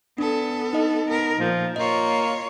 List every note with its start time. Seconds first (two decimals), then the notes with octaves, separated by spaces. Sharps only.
0.18 B3 D4 A4
0.73 D#4 D#5
1.08 B3 A#4
1.39 A#2 F3
1.76 A#3 F4 C#5 D#5